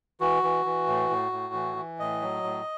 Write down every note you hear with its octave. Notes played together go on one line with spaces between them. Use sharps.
E3 F#4
E3
E3
A2
A2
A2
E3
E3
A2 D#5
F#3
A2